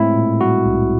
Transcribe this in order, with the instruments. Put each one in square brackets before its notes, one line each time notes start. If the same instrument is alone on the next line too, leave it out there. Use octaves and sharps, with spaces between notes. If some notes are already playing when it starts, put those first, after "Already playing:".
Already playing: [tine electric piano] A2 G#3 C4 E4
A#2
G3 F#4
C2